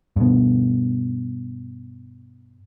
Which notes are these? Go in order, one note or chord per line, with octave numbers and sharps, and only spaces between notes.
G2 B2